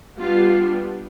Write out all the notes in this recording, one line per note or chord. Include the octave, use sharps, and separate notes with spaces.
G3 B3 D4 F4